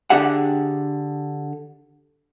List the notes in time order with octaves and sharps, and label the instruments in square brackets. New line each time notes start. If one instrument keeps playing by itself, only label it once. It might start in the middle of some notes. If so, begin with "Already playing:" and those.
[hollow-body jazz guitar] D3 D4 G4 G#4 E5 F#5